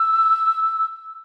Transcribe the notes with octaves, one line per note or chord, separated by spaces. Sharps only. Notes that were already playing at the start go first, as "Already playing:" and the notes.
Already playing: E6